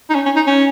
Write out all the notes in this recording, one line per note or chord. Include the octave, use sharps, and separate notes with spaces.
D#4
C#4
C#4
D#4
C#4